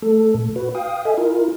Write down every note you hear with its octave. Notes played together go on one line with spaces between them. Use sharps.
A3 A4
A#2
F#4 B4
F5 G5 D#6
A4 D#5 E5 G#5
E4 F4 A#4